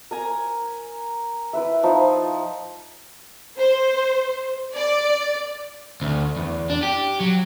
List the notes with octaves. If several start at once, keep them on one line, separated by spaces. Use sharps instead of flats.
A#4 G#5 A#5
E4 B4 E5
F3 D#4
C5
D5
D2
E2
D4
G4
F#3